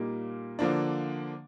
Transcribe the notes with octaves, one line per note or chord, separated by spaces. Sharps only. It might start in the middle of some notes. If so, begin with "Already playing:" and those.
Already playing: A#2 G3 A#3 D#4
D3 F3 A#3 D4